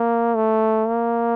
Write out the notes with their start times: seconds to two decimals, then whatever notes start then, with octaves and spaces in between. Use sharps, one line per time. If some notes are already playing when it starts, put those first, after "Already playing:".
Already playing: A#3
0.35 A3
0.86 A#3